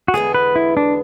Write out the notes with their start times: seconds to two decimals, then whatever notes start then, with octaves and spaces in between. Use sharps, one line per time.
0.08 F#4
0.14 E2 D3 G#3 B3 G#4
0.34 B4
0.56 E4
0.77 D4